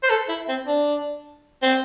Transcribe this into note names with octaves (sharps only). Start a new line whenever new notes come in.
C5
A4
E4
C4
D4
C4